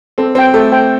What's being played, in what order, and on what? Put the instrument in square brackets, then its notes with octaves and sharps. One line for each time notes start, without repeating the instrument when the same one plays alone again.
[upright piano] C4 [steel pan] A4
[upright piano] C4 [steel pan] C5 G5
[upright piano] A3 [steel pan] A4
[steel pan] C5 G5